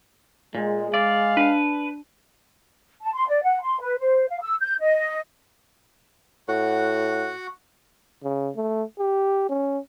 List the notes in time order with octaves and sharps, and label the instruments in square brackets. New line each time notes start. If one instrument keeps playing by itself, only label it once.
[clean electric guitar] A#2 [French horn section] G#3
[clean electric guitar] D5 [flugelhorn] F5
[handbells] D4 [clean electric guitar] B4
[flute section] A5
C6
D5
F#5
C6
B4
C5
F5
E6
G6
D#5
[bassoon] A2 [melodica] F#4 F#5
[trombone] C#3
A3
G4
C#4